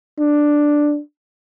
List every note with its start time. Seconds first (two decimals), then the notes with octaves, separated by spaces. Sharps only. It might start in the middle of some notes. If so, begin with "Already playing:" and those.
0.20 D4